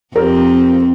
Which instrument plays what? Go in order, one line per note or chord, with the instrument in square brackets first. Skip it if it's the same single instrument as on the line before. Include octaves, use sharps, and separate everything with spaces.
[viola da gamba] F2 C4 [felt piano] G4 A#4